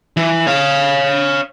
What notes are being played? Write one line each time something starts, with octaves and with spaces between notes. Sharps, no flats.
E3
C#5 F5